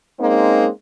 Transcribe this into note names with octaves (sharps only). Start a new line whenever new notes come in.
G#3 A#3 C4 C#4 D#4